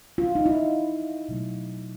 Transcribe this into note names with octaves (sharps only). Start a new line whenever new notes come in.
F4
D#4
E4
B2 F#3 A3